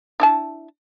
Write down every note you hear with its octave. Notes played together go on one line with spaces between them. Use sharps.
D4 E4 A5